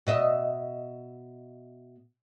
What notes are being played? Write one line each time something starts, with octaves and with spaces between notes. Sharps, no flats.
B2 D#5 E5